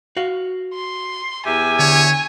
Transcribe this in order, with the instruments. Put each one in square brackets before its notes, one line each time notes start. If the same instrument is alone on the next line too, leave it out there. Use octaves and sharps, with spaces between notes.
[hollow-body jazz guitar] F#4 F5
[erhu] C6
[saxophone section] E2 G4 E5 [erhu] G#5
[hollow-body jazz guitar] D3 [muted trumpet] C#5